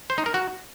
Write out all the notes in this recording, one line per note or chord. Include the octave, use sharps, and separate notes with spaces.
C5
D#4
A#4
F#4